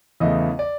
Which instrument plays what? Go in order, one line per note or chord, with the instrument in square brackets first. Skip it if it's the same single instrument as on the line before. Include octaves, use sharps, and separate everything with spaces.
[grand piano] E2 C#3 E3 A3 D#5
D5